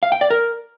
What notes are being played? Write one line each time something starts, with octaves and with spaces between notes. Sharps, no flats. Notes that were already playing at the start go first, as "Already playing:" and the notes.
F5
G5
D5
A#4